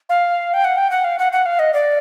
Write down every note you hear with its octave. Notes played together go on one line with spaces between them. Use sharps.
F5
G5
F#5
G5
F#5
F5
F#5
F#5
F5
D#5
D5